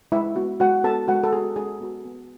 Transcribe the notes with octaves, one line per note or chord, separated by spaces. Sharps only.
G#3 E4 E5
B3 F#4
G#3 F#4 F#5
B3 F#4 A4 A5
G#3 F#4 F#5
A4
B3 F#4 G#4
G#3 G#4
B3 F#4
B3